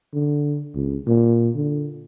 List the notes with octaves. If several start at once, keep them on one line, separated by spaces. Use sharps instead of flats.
D3
C#2
A#2
D3